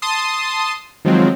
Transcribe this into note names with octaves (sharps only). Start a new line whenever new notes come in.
A5 C6 D#6
D#3 F3 F#3 G#3 C4